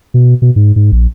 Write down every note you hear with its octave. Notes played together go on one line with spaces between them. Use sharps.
B2
B2
G#2
G#2
A#1